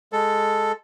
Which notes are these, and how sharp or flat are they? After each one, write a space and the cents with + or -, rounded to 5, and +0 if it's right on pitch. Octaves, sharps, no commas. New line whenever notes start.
G#3 +0 A4 +0